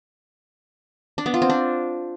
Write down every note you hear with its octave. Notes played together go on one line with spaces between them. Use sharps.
D4
B3
F4
C4
D4